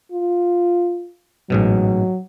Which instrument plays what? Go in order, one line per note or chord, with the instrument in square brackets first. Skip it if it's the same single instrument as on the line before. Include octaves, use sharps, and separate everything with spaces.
[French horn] F4
[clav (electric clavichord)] A1 G#2 B2 [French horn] F#3